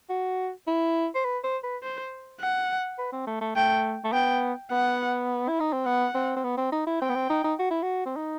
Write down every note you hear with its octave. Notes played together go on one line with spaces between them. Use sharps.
F#4
E4
C5
B4
C5
B4
C5
F#5
B4
C4
A3
A3
A3 G5
A3
B3 G5
B3 F#5
E4
D#4
C4
B3 F#5
C4
C4
B3
C4
D#4
E4
C4 G5
B3
C4
D#4
D#4
F#4
E4
F#4
C4
D#4